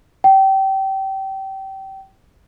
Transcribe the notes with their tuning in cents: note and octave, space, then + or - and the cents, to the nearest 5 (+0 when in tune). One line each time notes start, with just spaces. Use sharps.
G5 -25